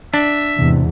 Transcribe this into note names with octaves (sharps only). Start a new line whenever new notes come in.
D4 E5
E2 G#2 C3